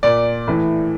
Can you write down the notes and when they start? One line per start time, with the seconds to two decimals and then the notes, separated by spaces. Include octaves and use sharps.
0.03 A#2 D5
0.47 A2 E3